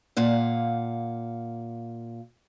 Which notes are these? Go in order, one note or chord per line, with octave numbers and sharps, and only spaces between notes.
A#2 F5 F#5